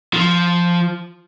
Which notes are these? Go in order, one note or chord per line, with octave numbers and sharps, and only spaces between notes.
F3